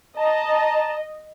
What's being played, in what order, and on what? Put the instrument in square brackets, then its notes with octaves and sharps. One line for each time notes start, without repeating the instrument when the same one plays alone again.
[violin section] D#5 [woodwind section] A5 A#5